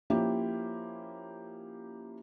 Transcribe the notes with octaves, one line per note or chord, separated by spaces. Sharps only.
F3 A#3 C#4 E4 G4